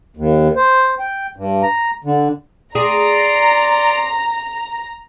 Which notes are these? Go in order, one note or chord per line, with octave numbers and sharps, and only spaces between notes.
D#2
C5
G5
G2
A#5
D3
G#4 D5 A#5 C6